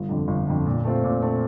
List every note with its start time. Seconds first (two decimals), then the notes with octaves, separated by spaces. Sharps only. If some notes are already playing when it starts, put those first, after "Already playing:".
Already playing: G1
0.09 F2 D3
0.28 G1
0.48 F2 D3
0.66 A#2
0.85 A3 C4 F4
1.04 A#2
1.22 A3 C4 F4